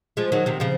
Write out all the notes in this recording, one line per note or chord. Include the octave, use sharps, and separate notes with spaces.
F3 G#3
D#3 F#3
C3 D#3
C#3 F3